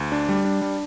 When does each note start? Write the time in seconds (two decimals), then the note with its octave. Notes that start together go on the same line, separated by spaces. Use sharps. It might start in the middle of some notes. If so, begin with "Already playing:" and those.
Already playing: D2
0.12 D4
0.29 G3
0.45 D4
0.62 G3